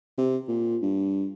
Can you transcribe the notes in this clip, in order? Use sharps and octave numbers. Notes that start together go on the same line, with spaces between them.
C3
A#2
G2